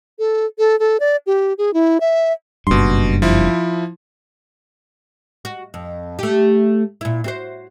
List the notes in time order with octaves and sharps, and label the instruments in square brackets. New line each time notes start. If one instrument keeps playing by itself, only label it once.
[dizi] A4
A4
A4
D5
G4
G#4
E4
E5
[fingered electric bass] F#1 G2 [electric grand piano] B2 C6
[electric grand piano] F3 E4
[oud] F#4
F2
A3 G4
A#2 E4
C4 F#4 C5